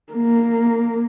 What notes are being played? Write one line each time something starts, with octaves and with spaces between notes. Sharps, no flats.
A#3